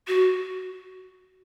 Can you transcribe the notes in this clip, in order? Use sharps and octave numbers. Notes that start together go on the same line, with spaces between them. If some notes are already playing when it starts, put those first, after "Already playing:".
F#4